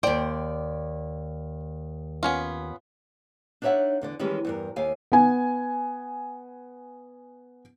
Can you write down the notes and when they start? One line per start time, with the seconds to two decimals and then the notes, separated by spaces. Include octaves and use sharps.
0.03 D#2 C5 D5 G5
2.23 B3 C#4 F4
3.62 D4 D#4 C#5 D5 E5 F#5
4.01 E2 D3 D5
4.19 D#3 E3 G3 G#3 C#4
4.45 E2 G2 A#4
4.76 D#2 F5 G#5
5.12 B3 G#5